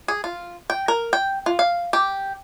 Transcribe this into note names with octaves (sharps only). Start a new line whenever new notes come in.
G#4
F4
G5
A#4
G5
F4
F5
G4